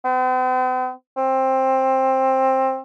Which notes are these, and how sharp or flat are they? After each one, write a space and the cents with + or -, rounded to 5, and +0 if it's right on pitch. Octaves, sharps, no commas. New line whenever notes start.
C4 -45
C4 +15